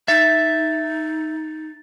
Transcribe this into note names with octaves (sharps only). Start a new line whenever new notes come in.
D#4 E5 A6